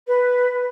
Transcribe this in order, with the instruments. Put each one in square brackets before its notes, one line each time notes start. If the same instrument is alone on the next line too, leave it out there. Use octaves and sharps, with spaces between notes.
[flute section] B4